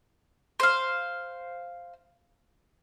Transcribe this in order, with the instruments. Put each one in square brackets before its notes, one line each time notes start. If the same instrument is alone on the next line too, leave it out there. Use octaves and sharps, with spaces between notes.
[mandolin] C5 F5